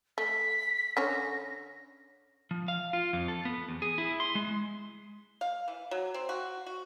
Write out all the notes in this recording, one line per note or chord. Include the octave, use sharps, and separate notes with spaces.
A3 B6
D3 C#4 C#5 A#6
F3
F5
F4
F2
A4
B3
E2
G#4
E4
C6
G#3
F5
E3
F#3
C4
F#4
F#4